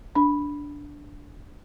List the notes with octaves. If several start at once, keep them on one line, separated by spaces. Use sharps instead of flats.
D4 B5